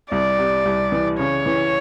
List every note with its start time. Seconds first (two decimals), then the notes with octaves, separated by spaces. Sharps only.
0.11 C2 D5
0.38 C3
0.65 C2
0.92 E3
1.19 C#3 C#5
1.46 E3